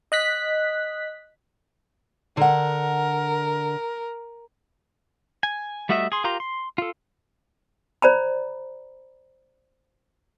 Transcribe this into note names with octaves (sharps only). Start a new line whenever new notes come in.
D#5 F#6 B6
D3 A#4 F#5
G#5
G3 A3 F#4 D#5 E5
G#4 C6
F4 G4 A#4 A#5 C6
C6
F4 A4
C5 D5 A#5 B5